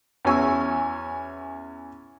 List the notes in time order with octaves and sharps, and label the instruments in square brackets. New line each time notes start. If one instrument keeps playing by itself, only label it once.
[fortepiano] E2 C#4 F#4 G#5 C#6 E6